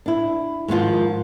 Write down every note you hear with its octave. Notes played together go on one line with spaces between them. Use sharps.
D4 E4
G#2 D#3 F3 F4